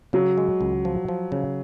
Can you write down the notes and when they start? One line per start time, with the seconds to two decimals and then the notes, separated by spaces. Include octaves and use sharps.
0.13 C#3 F#3
0.38 G#3
0.61 C#2
0.85 F3
1.08 F3
1.32 C#3